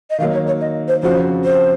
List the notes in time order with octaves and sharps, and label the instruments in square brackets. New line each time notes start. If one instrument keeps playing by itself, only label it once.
[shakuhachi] D#5
[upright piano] D#3 F#3 A#3 [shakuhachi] F5
[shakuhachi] C#5
C#5
D#5
C5
[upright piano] F2 C#3 F3 C4 F#4 [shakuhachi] C5
[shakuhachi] C5